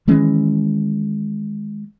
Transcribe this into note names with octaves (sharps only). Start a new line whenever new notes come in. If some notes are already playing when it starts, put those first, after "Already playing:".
D#3 E3 G#3 C#4